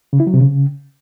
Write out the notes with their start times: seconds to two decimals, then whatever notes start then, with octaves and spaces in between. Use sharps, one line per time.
0.13 C#3
0.20 E4
0.27 F#3
0.34 C3
0.41 C#3